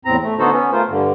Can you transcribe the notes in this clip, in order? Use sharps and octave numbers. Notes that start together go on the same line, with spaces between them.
E2 A2 C4 A#5
A3
D3 B3 D#4 F#4 A4 C5
B3 C#4
A3 F4 A#4 C5
G2 D3